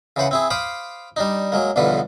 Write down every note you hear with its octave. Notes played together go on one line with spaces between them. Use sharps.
C#3 E3 C5 F#5
C4 E4 G#4
C5 F5 B5 D6 D#6
G3 D4 D#4
F#3 G#3 A#3
B1 E2 G2 D3 F3 B4